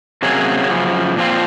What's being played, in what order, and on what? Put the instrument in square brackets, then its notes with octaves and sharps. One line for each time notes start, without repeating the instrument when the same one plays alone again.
[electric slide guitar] C3 F#3 A#3 C#4 G#4
F#2 C#3 F3
A#2 F3 C4 F4